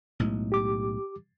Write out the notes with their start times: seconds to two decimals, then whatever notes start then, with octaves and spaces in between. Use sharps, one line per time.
0.20 B1 A2 G#3
0.52 G4 D6